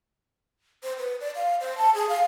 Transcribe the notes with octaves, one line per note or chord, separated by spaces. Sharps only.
C5
B4
D5
F5
C5
A5
G#4
F5